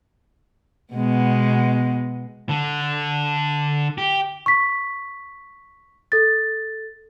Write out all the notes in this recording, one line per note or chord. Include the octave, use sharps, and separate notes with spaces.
B2 G#3 B3
D3
G4
C#6 B6
A4 A6